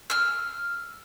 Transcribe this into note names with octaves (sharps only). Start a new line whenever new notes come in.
E6 F6